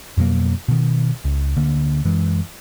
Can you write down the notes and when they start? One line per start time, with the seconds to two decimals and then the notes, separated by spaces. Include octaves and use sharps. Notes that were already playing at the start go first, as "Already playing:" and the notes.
0.17 F2 B2 F#3 A#3
0.68 B2 D#3
1.24 C#2
1.57 D2 D3 A#3
2.05 F#2 E3 G#3